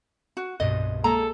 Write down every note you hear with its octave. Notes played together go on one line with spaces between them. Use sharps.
F#4
C2 G2 B2 D#5
G#3 A#3 G#4 A4 A#5